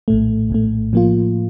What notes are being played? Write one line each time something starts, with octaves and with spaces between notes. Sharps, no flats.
A#1 A2 A3
A#1 A2 A3
A2 F3 A#3 F4